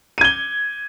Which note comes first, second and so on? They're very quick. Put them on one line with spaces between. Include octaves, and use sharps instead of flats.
D#7 G#6 G7